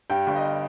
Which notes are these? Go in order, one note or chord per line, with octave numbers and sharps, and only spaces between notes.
G2 G5
G1
D#5